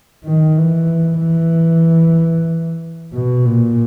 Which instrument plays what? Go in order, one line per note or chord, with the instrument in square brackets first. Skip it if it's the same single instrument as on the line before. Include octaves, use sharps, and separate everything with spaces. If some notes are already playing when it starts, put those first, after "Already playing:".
[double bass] D#3
E3
E3
B2
A#2